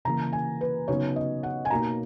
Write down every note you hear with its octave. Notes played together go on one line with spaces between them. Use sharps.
C#3 E3 A#3 A#5
G#5
B4
C#3 F#3 B3 D#4 C#5
D#5
F#5
G#5
B2 A#3 D#4 A#5